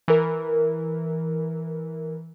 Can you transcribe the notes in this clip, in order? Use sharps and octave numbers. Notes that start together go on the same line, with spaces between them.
E3 A#4